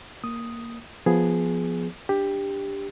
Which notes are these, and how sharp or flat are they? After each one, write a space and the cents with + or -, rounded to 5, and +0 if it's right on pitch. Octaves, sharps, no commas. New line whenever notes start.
A#3 +0 D#6 +0
F3 +0 B3 +0 G#4 +0
D4 +0 G4 +10